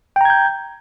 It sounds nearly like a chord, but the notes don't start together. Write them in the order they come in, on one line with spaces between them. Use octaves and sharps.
G5 A#5 G#6 G6